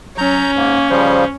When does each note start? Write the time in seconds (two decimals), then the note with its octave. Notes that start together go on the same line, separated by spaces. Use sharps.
0.18 F#3 C#4 A#5 G6
0.55 G#2 A#3
0.90 C#3 F3 G3 C5